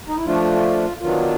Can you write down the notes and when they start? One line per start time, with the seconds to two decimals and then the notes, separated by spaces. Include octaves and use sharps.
0.08 D#4
0.17 E4
0.26 F3 A3 D4 F4
1.00 D#3 F#3 B3 D4 F4